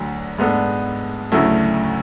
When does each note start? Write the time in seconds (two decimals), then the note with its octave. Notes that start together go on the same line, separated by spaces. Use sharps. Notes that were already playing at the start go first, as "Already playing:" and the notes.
Already playing: D2 D3 F#3
0.39 G#2 G#3 B3 D4 A4
1.32 D2 C#3 F#3 A3 E4